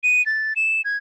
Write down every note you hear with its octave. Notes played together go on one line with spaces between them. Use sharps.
D#7
A6
E7
G#6